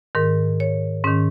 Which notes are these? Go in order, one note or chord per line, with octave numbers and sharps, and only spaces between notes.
G#2 D#3 A#4
C#5
G#2 D#3 C#4